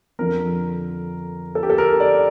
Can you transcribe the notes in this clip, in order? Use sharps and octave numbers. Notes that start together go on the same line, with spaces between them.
F2 D3 F3 A#4
A4
G4
A4
A#4
D5